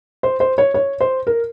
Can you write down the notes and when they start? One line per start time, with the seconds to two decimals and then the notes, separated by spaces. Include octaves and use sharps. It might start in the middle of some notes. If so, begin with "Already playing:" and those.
0.23 C5
0.40 C5
0.58 C#5
0.74 C#5
1.00 C5
1.27 A#4